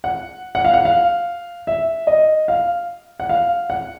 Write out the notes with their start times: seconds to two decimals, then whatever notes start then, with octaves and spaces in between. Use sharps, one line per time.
0.04 F#5
0.55 F#5
0.65 F5
0.73 F#5
0.85 F5
1.67 E5
2.07 D#5
2.48 F5
3.20 F#5
3.29 F5
3.70 F#5